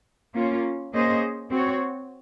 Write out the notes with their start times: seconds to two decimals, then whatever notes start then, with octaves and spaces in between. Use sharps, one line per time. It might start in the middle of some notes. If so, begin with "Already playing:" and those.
0.34 A#3 C#4 F4
0.93 A#3 C#4 G#4 C5 D#5
1.50 C4 F#4 C#5